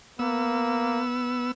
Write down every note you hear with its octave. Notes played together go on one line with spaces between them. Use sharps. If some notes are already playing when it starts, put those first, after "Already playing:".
A#3 B3 E6